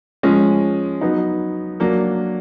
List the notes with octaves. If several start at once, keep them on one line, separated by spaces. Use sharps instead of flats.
F3 G#3 C#4
F#3 B3 D#4
F#3 A#3 D4